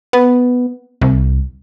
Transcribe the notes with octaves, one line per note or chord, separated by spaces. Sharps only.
B3
C2